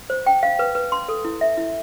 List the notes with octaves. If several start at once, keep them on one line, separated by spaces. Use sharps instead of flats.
C5
G5
F5
B4
B4
C6
A4
E4
E5
E4